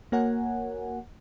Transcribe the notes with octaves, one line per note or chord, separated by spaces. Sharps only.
A#3 F#4 A#4 C#5 F#5 G#5